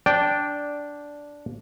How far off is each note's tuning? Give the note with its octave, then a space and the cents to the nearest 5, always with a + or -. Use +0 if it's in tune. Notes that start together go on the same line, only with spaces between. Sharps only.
D4 -10 D5 +0 G5 +0